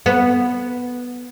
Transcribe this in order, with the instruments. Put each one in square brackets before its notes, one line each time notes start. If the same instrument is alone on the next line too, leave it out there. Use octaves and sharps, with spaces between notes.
[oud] B3